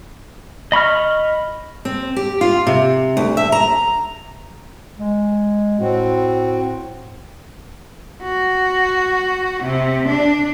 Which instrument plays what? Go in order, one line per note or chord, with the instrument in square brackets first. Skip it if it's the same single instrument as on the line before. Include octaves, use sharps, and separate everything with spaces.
[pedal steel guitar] D#5 B5 C#6 F6
[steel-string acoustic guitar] C4
G4
F4
C3
D2
E5
A#5
[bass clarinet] G#3
[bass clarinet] A2 [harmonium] C4 F#4
[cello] F#4
C3
D4